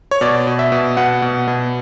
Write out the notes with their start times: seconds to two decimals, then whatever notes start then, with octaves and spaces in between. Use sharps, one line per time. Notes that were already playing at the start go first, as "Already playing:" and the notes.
0.11 C#5
0.21 B2 D5
0.47 B2
0.59 E5
0.72 B2
0.97 B2 F#5
1.22 B2
1.48 B2